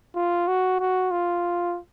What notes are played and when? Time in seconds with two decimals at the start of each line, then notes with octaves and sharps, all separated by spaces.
0.15 F4
0.48 F#4
0.80 F#4
1.11 F4